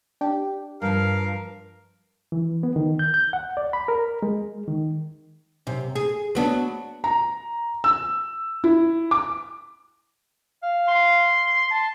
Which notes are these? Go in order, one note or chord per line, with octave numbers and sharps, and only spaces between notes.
D4 G4
G2 F3 A#4 F5
E3
B3
D#3
G6
G6
F#5
D5
B5
A#4
G#3
D#3
F#2 C3
G#4
F#3 B3 D4
A#5
E6
E4
D6
F5
C6
A5